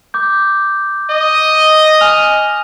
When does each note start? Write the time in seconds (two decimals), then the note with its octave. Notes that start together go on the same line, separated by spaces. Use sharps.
0.14 D6 G6
1.10 D#5
2.01 G#5 F6 F7